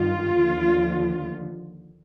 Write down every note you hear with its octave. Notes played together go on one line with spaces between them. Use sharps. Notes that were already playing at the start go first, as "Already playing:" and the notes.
Already playing: G2 D#3 G3 F4
D#2 D3 F3